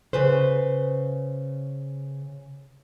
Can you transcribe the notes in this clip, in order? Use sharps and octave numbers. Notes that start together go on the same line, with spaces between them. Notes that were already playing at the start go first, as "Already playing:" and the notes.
C#3 B4 C5